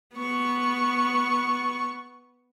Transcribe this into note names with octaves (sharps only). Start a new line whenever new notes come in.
B3 C#6